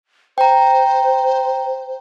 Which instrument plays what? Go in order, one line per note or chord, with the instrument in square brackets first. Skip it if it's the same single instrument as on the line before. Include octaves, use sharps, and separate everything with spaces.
[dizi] C5 [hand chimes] G5 A#5